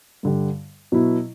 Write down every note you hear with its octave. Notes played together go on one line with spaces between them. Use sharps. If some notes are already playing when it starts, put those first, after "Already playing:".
G2 D3 G3
B2 F#3 B3 E4